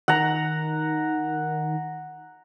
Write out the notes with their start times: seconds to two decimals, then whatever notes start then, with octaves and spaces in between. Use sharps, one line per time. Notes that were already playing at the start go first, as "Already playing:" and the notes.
0.08 D#3 F#5 A#5